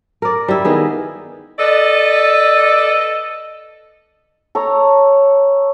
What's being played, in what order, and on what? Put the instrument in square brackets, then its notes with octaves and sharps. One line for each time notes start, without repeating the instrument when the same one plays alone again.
[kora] A#4 D5
G3 E4
D#3 B3 G#4
[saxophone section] A4 B4 D5 D#5
[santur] A4 C#5 A#5